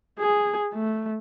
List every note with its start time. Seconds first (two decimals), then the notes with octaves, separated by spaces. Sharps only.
0.19 G#4
0.73 A3